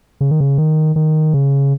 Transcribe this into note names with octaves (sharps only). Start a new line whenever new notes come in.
C#3
D#3
C#3
D#3
D#3
C#3